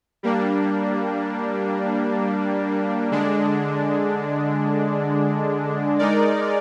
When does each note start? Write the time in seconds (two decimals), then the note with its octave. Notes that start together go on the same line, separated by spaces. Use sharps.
0.23 G3 A#3 D4
3.11 D3 G#3 D4
5.99 G#3 D#4 A#4 D5